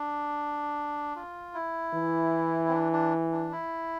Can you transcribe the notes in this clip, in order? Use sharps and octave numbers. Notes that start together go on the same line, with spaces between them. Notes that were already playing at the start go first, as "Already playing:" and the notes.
Already playing: D4
F4
E4
E3
C4
D4
D4
D4
E4